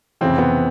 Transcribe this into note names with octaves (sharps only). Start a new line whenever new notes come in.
F1 F2 C#3 E3 C4
B3